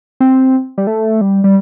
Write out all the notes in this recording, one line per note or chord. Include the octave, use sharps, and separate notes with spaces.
C4
G3
A3
G3
G3